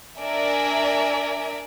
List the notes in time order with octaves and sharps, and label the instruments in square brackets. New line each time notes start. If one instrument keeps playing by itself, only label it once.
[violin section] D4 A#4 D5 E5 G#5